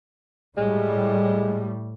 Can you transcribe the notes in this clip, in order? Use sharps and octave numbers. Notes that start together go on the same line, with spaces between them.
A2 G3 G#3